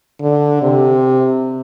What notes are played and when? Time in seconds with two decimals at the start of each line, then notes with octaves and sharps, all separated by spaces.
0.21 D3
0.62 C3